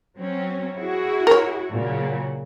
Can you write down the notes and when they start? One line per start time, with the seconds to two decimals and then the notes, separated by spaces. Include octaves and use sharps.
0.17 F#3 C4 C#4
0.76 E4 F#4 G#4
1.27 A#4 C#5
1.72 A#2 C#3 F#3